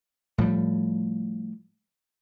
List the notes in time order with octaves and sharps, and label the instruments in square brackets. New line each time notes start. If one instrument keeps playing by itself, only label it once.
[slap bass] A2 F3 G3